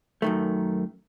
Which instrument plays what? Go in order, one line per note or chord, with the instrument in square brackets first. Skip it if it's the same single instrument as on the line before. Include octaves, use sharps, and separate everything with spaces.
[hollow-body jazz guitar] F#2 D#3 A3